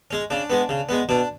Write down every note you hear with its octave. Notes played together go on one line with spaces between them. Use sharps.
G#3 C#4
C#3 D4
G#3 B3
C#3
G#3 B3
B2 D4